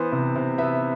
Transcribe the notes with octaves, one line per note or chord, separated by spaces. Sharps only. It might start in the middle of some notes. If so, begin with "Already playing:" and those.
Already playing: E3 B3 C5
C3
C3
B3 E5